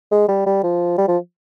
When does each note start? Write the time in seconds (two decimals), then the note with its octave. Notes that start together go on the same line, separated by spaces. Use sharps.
0.12 G#3
0.28 G3
0.46 G3
0.64 F3
0.98 G3
1.08 F3